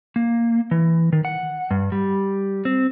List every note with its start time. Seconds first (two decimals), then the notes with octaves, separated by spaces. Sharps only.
0.16 A#3
0.71 E3
1.13 D#3
1.25 F#5
1.71 G2
1.92 G3
2.65 C4